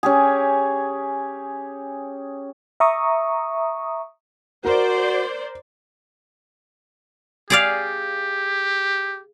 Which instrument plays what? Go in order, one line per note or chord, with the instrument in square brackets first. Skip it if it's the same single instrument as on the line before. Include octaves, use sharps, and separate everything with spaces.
[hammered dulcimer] C#4 G4 G#4
[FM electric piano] E5 A#5 C#6 D#6
[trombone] F#4 [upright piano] A#4 [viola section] C5 D5
[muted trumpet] G4 [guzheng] G#4 D5 F5